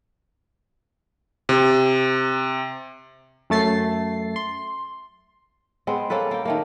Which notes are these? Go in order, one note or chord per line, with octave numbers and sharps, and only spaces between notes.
C3
F#2 A3 A6 C7
C6
G#3 B3 C4
A#3 C#4 A4 B4
A#3 G5
D#3 A3 A#3